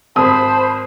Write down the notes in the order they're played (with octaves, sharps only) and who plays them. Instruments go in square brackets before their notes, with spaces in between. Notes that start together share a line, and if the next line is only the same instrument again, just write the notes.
[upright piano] G#1 D#6 [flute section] C5 B5 [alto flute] A5